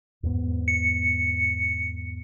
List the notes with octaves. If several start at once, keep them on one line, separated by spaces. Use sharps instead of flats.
E2 G#2 B3
C#7